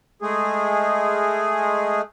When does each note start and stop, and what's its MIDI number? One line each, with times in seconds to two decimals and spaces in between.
0.22 2.01 56
0.22 2.01 57
0.22 2.01 68